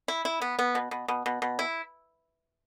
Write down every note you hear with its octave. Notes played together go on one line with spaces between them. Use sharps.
E4
E4
B3
B3
B2
B2
B2
B2
B2
E4